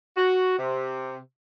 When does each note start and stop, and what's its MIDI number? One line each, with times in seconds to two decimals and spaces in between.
0.17 0.58 66
0.59 1.18 48